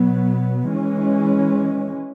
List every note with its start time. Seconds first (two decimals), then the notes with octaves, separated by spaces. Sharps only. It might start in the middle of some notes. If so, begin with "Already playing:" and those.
Already playing: B2 F#3 B3
0.70 E3 G#3 C#4